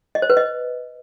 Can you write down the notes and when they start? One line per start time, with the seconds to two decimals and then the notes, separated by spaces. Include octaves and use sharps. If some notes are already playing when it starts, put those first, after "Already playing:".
0.15 D#5
0.22 C5
0.30 B4
0.37 D#5